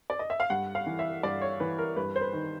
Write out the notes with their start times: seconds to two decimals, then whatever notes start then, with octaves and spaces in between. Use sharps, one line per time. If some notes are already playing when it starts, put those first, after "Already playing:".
0.10 D5
0.19 D#5
0.30 E5
0.40 F5
0.50 G2 F#5
0.75 F5
0.87 E3
0.99 E5
1.23 G2 D5
1.41 C#5
1.60 E3 B4
1.78 A#4
1.96 G2 B4
2.16 C5
2.21 B4
2.33 D#3